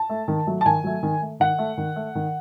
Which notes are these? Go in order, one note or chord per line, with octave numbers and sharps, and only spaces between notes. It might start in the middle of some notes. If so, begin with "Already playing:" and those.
Already playing: A5
A3
D#3
F#3 A3
A5
D#3 G#5
F#3 A3
D#3
A3
D#3 F#5
A3
D#3
A3
D#3